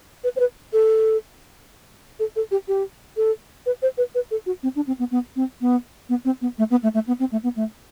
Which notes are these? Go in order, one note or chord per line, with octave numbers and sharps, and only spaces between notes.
B4
C5
B4
A4
A4
A4
G4
G4
A4
B4
C5
B4
B4
A4
F#4
C4
D4
C4
B3
B3
C4
B3
B3
C4
B3
A3
B3
A3
A3
B3
C4
A3
B3
A3